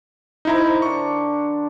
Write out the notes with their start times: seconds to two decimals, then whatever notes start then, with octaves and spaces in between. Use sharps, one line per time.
0.45 D#4 E4 A#4 C5 A#5
0.82 D3 D4 C#6